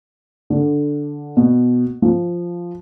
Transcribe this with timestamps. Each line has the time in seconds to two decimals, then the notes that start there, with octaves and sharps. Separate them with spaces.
0.50 D3
1.37 B2
2.02 F3